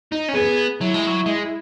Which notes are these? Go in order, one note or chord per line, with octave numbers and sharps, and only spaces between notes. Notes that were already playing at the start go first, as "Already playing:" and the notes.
D#4
C#4
B3 G#4
F#3 E4
G#3
F#3
G#3